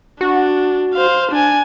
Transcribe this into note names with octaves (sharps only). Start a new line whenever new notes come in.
D4 F#4
C5 F5
D4 G#5